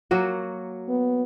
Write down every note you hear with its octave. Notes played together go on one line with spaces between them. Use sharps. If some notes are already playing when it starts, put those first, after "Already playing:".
F#3 A#3 F#4
B3